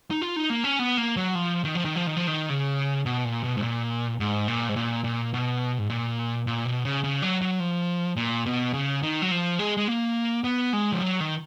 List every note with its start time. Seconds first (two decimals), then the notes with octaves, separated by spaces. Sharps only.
0.11 D#4
0.22 F4
0.36 D#4
0.50 A#3
0.64 C#4
0.79 B3
0.98 A#3
1.16 F#3
1.35 F3
1.64 D#3
1.75 F3
1.85 D#3
1.96 F3
2.07 D#3
2.17 F3
2.27 D#3
2.50 C#3
3.06 B2
3.25 A#2
3.44 B2
3.57 G#2
3.62 A#2
4.20 G#2
4.48 A#2
4.69 G#2
4.76 A#2
5.04 A#2
5.34 B2
5.78 G#2
5.90 A#2
6.47 A#2
6.65 B2
6.85 C#3
7.04 C#3
7.22 F#3
7.41 F#3
7.60 F3
8.17 A#2
8.46 B2
8.74 C#3
9.02 D#3
9.22 F#3
9.31 F3
9.59 G#3
9.77 G#3
9.88 A#3
10.44 B3
10.73 G#3
10.92 F3
11.02 F#3
11.20 D#3